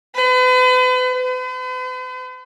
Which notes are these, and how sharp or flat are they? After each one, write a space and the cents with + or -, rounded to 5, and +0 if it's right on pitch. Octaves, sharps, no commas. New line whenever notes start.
B4 +40
B4 +45